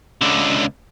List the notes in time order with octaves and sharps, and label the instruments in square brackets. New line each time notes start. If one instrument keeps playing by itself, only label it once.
[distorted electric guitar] C#2 D3